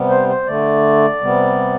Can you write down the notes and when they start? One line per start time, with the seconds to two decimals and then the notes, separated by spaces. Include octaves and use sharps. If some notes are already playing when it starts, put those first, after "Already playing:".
Already playing: C3 G3 B3
0.09 C5
0.28 C5
0.47 D3 A3 D5
1.21 C3 G3 B3